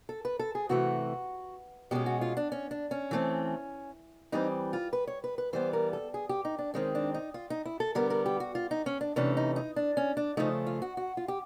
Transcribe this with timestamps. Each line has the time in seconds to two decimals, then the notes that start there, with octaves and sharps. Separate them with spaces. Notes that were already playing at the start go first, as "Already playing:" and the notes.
0.09 A4
0.25 B4
0.39 A4
0.55 G#4
0.69 C3 E3 A3 F#4
1.91 B2 G#3 C#4 G4
2.06 F#4
2.21 F4
2.37 D4
2.52 C#4
2.71 D4
2.91 C#4
3.11 E3 A3 C4
4.32 E3 G3 C4 D#4
4.73 F4
4.93 B4
5.07 C#5
5.24 B4
5.38 B4
5.53 E3 G3 B3 C5
5.73 A#4
5.93 A4
6.14 G#4
6.29 G4
6.45 D#4
6.59 D4
6.74 D#3 G#3 C4 C#4
6.95 D4
7.14 D#4
7.34 F4
7.50 D#4
7.66 E4
7.80 A4
7.95 D3 G3 B3 A#4
8.10 A#4
8.26 G4
8.40 F#4
8.55 F4
8.71 D#4
8.86 C#4
9.01 D4
9.16 C3 E3 A3 C#4 D4
9.37 D#4
9.56 D#4
9.76 D4
9.97 C#4
10.17 D4
10.37 C#3 F3 A3 D#4
10.67 F4
10.82 F#4
10.97 F#4
11.17 F4
11.28 G4